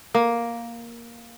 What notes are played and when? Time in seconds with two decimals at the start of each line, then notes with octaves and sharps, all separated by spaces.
0.15 A#3